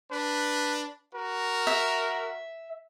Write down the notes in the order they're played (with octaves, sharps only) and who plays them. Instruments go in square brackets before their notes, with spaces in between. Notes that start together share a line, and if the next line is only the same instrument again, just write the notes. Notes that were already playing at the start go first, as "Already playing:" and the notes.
[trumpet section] D4 B4
F#4 A#4
[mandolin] E5